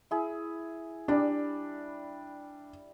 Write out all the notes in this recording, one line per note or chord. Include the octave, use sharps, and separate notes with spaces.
E4 G#4
G3 D4 D5